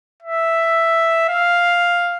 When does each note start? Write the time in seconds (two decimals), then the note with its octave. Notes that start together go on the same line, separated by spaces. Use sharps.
0.23 E5
1.29 F5